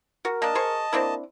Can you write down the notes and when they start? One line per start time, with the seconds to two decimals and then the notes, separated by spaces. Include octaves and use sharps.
0.25 F#4 A#4
0.42 A#3 D4 D#5 A5
0.55 G#4 C5 C#6
0.93 A#3 C4 D4 E4